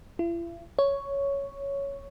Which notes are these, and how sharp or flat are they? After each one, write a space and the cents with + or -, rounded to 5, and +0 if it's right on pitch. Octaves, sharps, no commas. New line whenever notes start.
E4 +45
C#5 +5